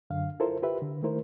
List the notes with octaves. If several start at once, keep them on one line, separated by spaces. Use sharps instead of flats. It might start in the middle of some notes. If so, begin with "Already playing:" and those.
F#2 D3 F5
E4 F4 A4 A#4 C5
F4 G4 B4 E5
D3
D#3 A3 E4 A#4 C5